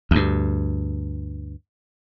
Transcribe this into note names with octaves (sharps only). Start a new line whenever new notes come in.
D2 G2